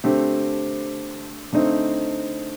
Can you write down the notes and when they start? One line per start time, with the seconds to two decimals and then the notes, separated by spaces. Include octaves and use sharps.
0.04 D3 A3 C4 G4
1.53 D3 A3 C4 D#4